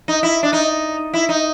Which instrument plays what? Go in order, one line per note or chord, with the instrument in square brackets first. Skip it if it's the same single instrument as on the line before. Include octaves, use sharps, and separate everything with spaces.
[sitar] D#4
E4
D4
D#4
E4
D#4